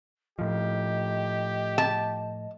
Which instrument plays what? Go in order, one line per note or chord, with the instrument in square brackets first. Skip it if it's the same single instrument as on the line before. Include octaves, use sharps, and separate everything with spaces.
[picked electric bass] A2 F3 [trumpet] G4 [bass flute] D#5
[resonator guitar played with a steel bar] A5